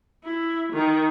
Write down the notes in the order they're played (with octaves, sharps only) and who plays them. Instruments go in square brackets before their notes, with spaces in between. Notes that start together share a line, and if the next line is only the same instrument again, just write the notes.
[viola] E4
D#3